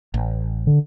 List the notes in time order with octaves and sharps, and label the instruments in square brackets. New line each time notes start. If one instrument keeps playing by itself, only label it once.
[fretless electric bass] A1
[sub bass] D3